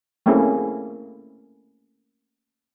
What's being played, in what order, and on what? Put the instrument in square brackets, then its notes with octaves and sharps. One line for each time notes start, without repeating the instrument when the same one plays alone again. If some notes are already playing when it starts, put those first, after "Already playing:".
[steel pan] A3 A#3 C4 C#4 E4 G#4